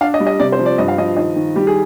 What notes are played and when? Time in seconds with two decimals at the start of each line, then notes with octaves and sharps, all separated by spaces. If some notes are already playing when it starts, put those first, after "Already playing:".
0.01 D4 F5
0.14 D#5
0.20 G3
0.27 D#5
0.40 C3 D5
0.52 C5
0.59 F3
0.66 D5
0.78 G2 D#5
0.88 F5
0.98 F3 D#5
1.17 D#3 D#5
1.36 D#3
1.56 G3 G4
1.67 G#4